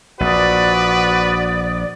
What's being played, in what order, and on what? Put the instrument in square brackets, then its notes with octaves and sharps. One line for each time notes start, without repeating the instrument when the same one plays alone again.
[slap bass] A#1 [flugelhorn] F#4 [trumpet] B4 [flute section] D5 D#6